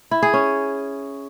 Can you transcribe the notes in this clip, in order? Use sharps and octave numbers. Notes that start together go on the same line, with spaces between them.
E4
G#4
C#4